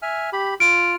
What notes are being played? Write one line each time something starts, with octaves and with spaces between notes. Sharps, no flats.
E5 G#5 F6
G4 B5
F4 F6 D7